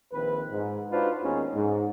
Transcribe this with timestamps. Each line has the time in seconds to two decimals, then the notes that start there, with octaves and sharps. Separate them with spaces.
0.12 A#1 D#3 C4 B4
0.52 G#2
0.92 D4 D#4 F4 F#4 B4 C5
1.23 D#2 D#3 G#3 B3 C#4 D#4
1.54 G#2